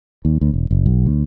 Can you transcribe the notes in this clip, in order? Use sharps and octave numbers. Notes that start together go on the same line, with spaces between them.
D#2
D2
E1
F#1
B1
D2